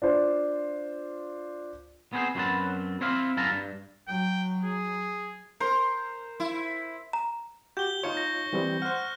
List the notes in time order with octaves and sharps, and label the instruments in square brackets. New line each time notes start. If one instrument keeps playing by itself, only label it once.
[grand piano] D4 F4 C5
[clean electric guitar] B3 C4 G#4 A#4 C5
F#2 F#3 G#3 C4 B4 A5
C4 E4 C5 F5
F#2 E4 F5 A5 A#5
G2
[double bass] F#3 [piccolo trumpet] G5
[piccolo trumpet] G#4
[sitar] A#4 [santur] C5
[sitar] E4
[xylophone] A#5
[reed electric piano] F#4 G4 [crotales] G6 G7
[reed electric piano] D#4 F4 C#5 [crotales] C#6 C#7 G7
[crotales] A#6
[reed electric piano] E3 G3 C4
[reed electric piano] C5 F#5 [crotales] F6 F#6